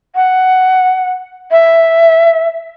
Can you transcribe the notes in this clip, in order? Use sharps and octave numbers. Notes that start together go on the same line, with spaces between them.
F#5
E5